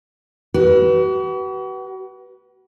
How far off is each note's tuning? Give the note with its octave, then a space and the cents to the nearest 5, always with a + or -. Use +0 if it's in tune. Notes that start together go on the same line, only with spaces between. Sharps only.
F#4 +40 B4 -15